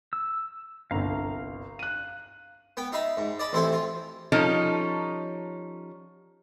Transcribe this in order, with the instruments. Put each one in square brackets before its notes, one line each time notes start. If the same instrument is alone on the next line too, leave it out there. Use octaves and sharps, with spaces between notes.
[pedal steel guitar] E6
[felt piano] G1 C2 [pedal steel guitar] F5 A#5
[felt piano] F#6 D#7
[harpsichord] B3 G5
D#4 E5 F5 A#5 B5
G#2
D5 D#5 A5 B5
A1 C4 E4 A4 C5 G#5
F4
[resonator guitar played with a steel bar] F3 G3 C#4 D#4 A4 C#5